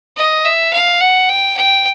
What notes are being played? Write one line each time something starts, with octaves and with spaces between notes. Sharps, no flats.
D#5
E5
F5
F#5
G5
G5